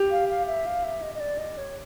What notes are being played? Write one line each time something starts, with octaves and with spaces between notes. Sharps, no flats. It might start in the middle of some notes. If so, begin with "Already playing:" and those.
Already playing: G4
F5
F5
E5
F5
E5
D#5
D#5
D5
D#5
C#5